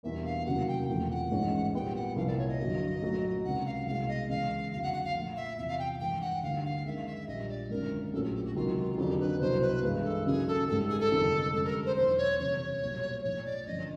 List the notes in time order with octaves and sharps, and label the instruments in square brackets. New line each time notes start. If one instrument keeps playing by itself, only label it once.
[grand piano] E2 B2 G3 A#3 D4 [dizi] E5
[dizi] F5
[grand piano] F1 D#2 C#3 F#3 A#3 [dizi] F#5
[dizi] G5
[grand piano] E1 E2 C3 F3 A3 [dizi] G5
[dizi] F#5
[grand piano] A1 G#2 E3 G#3 C#4
[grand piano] A#2 G3 B3 [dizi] G5
[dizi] F#5
[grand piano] C2 A#2 F3 [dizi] F5
[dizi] D5
C#5
D#5
[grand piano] G2 D3 F#3
A#2 F#3 A3
[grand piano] C#2 C3 D#3 [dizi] F#5
[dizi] F5
[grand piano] C2 B2 G#3 [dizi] F5
[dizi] D#5
[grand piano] C#2 C#3 E3 G#3 [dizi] F5
[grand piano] F#1 F2 D3 F#3 [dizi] F5
[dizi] F#5
F#5
F5
[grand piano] A#2 F3 A3
[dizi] E5
[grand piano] E2 C3 F3 [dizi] E5
[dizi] F5
G5
[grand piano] G#1 G2 E3 [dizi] G5
[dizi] F#5
[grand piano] D2 D3 G3 A#3 D#4 [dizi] F5
[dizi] F5
[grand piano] F#2 D#3 G#3 [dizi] E5
[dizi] E5
[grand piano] A#1 A#2 G3 [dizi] D#5
[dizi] D5
[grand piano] G#1 F#2 D3 [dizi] A#4
[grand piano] A#1 A2 F#3 A#3 C#4 [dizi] A4
[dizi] G#4
G4
F#4
[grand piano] C#2 C3 D#3 F#3 [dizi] F4
[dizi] F4
[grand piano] F2 D3 F#3 A#3 D4 [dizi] G4
[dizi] B4
[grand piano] C2 B2 F#3 [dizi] C5
[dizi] B4
[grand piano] G2 E3 G#3
[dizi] A4
[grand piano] D#2 C#3 F#3 A#3 D#4 [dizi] G#4
[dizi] A4
[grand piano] G#1 G#2 D#3 G3 [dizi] A4
[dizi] G#4
A4
[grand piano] G1 F2 C3 D#3 G#3
[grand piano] G#1 F#2 D3 G3 [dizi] A4
[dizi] A#4
C5
[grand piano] E2 B2 F#3 A#3 D#4 [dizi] C5
[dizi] C#5
[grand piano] F#1 F2 C3 E3 G3 [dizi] C#5
[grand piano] B1 A#2 G3 A#3
[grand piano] B1 A2 F3 A3 [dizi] C#5
[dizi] D5
[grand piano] A1 G2 D3 F3 A#3 [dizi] D#5